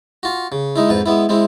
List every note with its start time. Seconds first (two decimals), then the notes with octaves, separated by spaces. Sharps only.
0.23 F4 F#4
0.52 C#3
0.76 G#3 D#4 E4
0.89 F2 G#2 B4
1.06 G#3 B3 E4
1.29 G#3 C4 E4